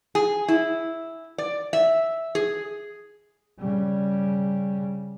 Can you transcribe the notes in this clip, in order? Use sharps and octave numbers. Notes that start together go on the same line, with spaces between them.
G#4
E4
D5
E5
G#4
C#3 G3